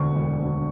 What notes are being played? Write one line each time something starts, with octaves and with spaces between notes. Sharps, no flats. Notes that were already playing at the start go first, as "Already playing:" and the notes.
Already playing: E1 D2 D3 C#6
E1
D2 D3